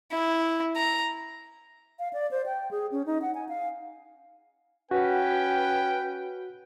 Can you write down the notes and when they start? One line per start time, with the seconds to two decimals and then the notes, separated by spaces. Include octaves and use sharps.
0.12 E4
0.76 A#5
1.99 F5
2.13 D5
2.31 C5
2.46 G5
2.71 G#4
2.92 C#4
3.06 D#4
3.22 F#5
3.35 G#5
3.49 F5
4.91 C#4 F#4 B4 G5